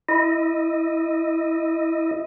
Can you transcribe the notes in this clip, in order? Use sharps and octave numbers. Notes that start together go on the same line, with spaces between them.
E4 D#5